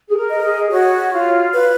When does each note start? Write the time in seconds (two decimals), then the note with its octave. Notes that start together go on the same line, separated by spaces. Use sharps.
0.09 G#4
0.16 A#4
0.30 D#5
0.43 G#4
0.71 F#4 C#5
1.12 F4
1.53 B4